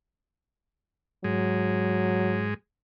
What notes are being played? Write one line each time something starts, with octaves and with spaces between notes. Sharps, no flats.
G#2 F#3 G#3